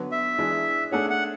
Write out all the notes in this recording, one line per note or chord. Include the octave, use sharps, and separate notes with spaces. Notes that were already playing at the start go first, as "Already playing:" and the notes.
Already playing: D3 F#3 B3 F#4 B4
E5
E3 G#3 D4 G#4 D5
A3 D4 G#4 C#5 F#5
F#5